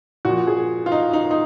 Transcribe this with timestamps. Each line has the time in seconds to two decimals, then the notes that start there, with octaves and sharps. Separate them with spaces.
0.25 A#2 F3 F#4
0.47 G#4
0.86 F4
0.92 D#4
1.13 D#4
1.31 D#4